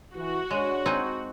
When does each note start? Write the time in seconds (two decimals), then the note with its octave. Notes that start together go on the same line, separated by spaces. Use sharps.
0.16 E3 F#4
0.51 G#3 D4 G#4 C#5
0.86 C4 D#4 G#5